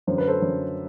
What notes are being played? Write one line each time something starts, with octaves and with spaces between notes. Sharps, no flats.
F#2 D3 C5
B4
A4 C5
F#2 D3